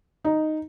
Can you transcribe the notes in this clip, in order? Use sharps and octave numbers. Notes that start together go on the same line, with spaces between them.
D#4